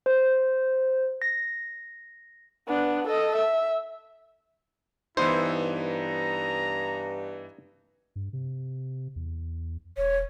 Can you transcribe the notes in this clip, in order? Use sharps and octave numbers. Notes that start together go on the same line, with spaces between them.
C5
A#6
B3 D4
A4 D#5
E5
G2 E3 B3 D#4 E4 C5
A#5
G2
C3
E2
E1 C#5